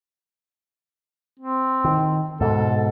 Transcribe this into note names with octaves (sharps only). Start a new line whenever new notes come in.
C4
D#3
G#2 B2 A4